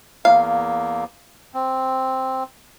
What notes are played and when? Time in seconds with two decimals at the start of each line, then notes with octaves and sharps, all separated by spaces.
0.25 E2 A#3 F5
1.54 C4